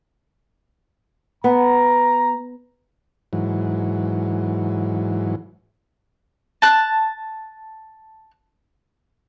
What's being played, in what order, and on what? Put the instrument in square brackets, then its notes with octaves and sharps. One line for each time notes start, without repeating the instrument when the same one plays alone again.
[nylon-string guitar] B3 [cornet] A#5
[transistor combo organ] G#2 E3 F#3
[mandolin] A5 F#6